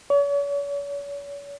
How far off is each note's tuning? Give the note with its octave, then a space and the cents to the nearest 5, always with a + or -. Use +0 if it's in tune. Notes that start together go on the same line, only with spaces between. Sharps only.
C#5 +40